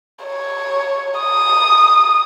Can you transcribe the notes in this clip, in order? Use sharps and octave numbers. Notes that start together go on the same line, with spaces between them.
C#5
D#6